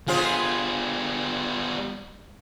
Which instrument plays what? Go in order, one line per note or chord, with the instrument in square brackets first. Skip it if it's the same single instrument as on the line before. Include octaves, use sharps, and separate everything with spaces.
[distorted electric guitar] G3 B3 [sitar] F4 G#4 C5